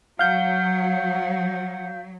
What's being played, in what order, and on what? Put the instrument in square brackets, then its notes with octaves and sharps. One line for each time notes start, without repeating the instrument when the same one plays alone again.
[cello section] F#3 [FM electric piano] F5 G6 [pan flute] F#5